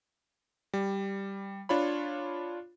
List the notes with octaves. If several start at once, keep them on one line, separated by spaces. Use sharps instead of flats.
G3
D4 F4 C#5 B5